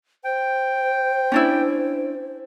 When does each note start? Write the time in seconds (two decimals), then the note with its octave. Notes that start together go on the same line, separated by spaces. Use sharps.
0.24 C5 G5
1.32 C#4 D4 E4